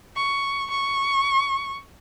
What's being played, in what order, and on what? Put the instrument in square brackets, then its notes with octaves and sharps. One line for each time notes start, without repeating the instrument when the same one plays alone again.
[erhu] C#6
C#6